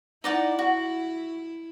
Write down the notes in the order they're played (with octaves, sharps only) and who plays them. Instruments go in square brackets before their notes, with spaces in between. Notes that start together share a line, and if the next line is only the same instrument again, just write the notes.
[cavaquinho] D#4 D5 F#5 [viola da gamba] E4
[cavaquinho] F#4